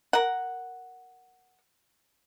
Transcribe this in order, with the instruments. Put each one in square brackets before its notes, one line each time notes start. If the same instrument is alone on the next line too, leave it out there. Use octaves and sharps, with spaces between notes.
[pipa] A#4 F#5